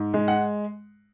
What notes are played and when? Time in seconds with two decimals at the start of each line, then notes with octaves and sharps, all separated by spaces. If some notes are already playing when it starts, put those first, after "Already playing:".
Already playing: G#2
0.14 G#3
0.28 F#5